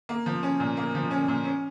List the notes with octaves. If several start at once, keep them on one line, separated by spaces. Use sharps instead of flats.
A#3
F3
C#4
A#2
A#3
F3
C#4
A#2
C#4